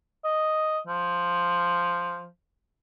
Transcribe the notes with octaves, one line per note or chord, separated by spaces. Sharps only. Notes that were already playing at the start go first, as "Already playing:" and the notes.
D#5
F3